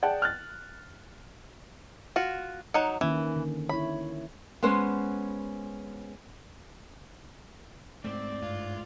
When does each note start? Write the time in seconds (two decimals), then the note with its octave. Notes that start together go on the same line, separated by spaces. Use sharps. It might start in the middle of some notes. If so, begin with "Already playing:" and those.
0.02 G#4 D5 F#5 G5 A5
0.22 F6 F#6 A6
2.16 F4 F#4
2.74 F#3 D#4 F#5
3.01 D#3 E3 A#3 C#4
3.36 D3
3.69 E4 C#5 B5
4.63 G#3 B3 C#4 C5 F#5
8.04 G#2 A3 C4 D5
8.42 G2 F4